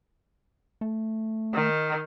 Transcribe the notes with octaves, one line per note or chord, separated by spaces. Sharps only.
A3
D#3